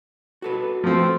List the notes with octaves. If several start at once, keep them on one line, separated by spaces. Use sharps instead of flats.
F#4 A4 B4
F3 A3 C4